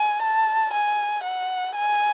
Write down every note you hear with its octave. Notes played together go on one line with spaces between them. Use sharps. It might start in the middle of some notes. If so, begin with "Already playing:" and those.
Already playing: G#5
A5
G#5
F#5
G#5